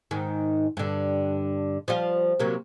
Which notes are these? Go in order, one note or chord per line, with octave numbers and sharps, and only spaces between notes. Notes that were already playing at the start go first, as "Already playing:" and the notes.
G#2 D#3
G2 D3
F3 G3 F4
C3 F#3 A#3